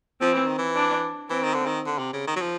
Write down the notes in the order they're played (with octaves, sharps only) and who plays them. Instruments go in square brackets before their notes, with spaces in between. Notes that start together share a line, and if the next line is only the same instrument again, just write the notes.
[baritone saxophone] F3 [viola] C4
[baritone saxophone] E3
D#3
E3
[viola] D4
[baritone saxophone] E3 [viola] C4
[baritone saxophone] D#3
D3
D#3
D3
C3
C#3
D#3
F#3
F3